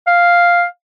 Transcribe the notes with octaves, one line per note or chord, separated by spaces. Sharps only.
F5